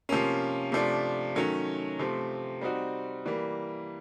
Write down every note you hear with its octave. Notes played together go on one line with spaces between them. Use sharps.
C3 F3 A#3 C#4
C3 F3 A3 D4
D#3 F#3 A3 C#4
C3 F3 A3 C4
G3 C4 D#4 F#4
E3 G3 A#3